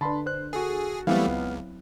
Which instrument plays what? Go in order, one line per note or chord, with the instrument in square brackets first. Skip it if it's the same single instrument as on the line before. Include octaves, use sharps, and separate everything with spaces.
[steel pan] D3 D4 B4 [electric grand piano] A5 B5 C6
[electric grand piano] C5 F#6
[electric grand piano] F#4 A4 [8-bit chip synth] G#4
[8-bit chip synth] E3 G3 A3 [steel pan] F#3 C4 E4 [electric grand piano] B3 F5
[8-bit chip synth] C#2